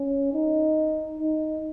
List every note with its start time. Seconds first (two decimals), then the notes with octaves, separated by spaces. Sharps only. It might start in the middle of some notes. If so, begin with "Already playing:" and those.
Already playing: C#4
0.33 D#4
1.20 D#4